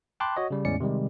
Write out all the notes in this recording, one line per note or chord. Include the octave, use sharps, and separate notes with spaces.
G5 A5 B5 C6 D6 F#6
F#4 C#5 D#5
C#3 G3
E2 A2 G#3 C#4 D5 C#7
C3 D#3 G3 G#3